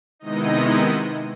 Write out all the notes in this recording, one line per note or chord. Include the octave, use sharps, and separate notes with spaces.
C3 D#3 G#3 B3 D#4 E4 D#5